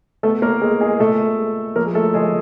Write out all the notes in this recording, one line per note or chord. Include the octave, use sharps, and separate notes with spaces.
A3 B3 A4
A#3 A#4
G#3 B3 G#4
G#3 G#4
A#2 A3 A4
G#3
F3 A#3 A#4
G#4
A3 A4
F3 G#3 G#4